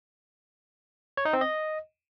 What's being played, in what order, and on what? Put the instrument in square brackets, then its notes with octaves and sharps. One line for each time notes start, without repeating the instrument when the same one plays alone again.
[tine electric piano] C#5
D#4
C4
D#5